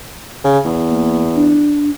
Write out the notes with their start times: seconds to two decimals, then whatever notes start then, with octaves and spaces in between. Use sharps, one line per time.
0.45 C#3
0.65 E2
0.90 A#3
1.35 D4